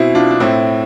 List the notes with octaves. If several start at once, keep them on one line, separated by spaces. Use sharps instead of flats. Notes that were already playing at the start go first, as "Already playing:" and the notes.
Already playing: B2 C4 E4
D4 F4
D4
A2 C4 E4